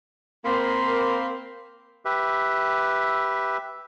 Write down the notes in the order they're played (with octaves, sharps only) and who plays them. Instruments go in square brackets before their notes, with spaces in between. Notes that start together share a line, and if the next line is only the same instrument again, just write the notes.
[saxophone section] A#3 [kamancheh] C4 [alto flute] A#4 [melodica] B5 C6
[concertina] G4 B4 E5